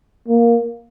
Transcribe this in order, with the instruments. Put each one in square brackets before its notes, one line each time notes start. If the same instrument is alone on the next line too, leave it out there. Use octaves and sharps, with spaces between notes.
[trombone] A#3